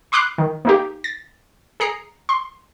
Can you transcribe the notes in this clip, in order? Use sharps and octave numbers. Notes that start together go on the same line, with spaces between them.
B5 C6 D6 F6 F#6 C7
D#3
A#3 D#4 G4
A6
G#4 A#5 C7
C6